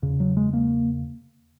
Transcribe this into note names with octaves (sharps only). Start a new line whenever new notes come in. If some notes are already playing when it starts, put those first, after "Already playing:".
E2 C#3
F#3
G#3
A#3